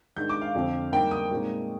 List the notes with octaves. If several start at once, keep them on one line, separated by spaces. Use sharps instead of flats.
G#2 D#3 G#3 D4 G6
D6
F5
F2 D3 F3 C4
G#2 G3 A#3 D#4 G5
D#6
A#2 G#3 C4 D#4